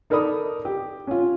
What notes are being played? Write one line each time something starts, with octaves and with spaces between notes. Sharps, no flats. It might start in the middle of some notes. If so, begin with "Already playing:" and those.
D#4 A4 A#4 D5 B5 D#6
G4
C#4 F4